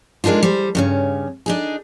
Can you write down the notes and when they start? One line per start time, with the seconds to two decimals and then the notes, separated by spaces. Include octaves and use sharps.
0.24 G#3 A#3 D4 D#4 F4
0.43 G3 C5
0.75 G2 C#3 C#4
1.46 D4 D#4 G#4